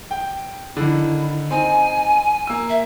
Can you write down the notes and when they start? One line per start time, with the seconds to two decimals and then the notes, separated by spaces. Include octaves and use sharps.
0.11 G5
0.77 D3 D#3 E4
1.51 C4 D#4 G#5
2.47 A#3 E6
2.70 E5